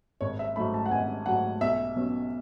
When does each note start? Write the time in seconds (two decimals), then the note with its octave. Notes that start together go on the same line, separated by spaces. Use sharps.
0.21 G#1 C#5
0.39 E5
0.56 G#2 F#3 A3 B5
0.74 A5
0.86 F#5
0.91 G#1 G#5
1.26 G#2 F#3 A3 F#5
1.61 B1 E5
1.96 B2 F#3 C#4